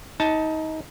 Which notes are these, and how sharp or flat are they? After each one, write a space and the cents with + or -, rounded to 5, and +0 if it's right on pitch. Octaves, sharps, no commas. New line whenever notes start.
D#4 +25 A5 +0